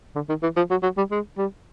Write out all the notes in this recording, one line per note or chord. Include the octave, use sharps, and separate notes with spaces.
D3
D#3
E3
F3
F#3
F#3
G3
G#3
G3